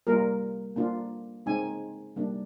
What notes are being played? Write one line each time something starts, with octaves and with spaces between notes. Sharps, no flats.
G3 A#3 F4 A#4
A#3 D4 F4
G#3 C4 D#4 G#5
G3 A#3 D4